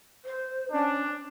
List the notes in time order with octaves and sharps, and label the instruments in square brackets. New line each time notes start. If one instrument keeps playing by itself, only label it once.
[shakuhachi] C5
[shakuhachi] C#4 [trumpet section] D4